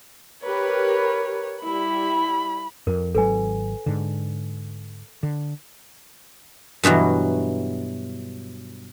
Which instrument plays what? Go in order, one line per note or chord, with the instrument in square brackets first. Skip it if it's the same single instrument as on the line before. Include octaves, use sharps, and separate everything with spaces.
[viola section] G4 A#4 B4 [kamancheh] C#5
[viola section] G3 E4 [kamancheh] B5
[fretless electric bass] F2 [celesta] A#4
[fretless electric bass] G#1 C#3 F#3 [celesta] A4 B4 G#5
[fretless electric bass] G#2 D3
D3
[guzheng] G2 B2 E3 F#3